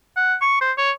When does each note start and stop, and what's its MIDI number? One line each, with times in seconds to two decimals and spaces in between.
0.16 0.35 78
0.41 0.57 85
0.61 0.72 72
0.78 0.91 73